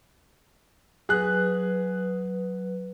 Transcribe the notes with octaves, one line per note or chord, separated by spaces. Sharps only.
F#3 G#4 B4 F#6